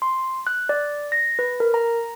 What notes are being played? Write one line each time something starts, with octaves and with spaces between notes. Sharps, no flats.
C6
F#6
D5
A#6
B4
A#4
A#5